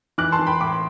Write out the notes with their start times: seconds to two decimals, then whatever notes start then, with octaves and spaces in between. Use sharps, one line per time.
0.18 E3 D6 F#6
0.32 A5 C6
0.39 E3
0.46 G5 B5
0.61 A2 B5 D6